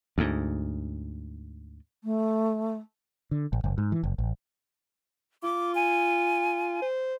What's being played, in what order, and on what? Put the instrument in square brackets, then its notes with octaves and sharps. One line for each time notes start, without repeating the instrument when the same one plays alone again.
[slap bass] D2 G#2
[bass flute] A3
[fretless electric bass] D3
A1
F#1
G#2
E3
F#1
A1
[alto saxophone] F4 [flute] D6
[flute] G#5
[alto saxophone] C5